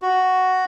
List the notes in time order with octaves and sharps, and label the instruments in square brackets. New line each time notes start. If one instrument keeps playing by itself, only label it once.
[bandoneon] F#4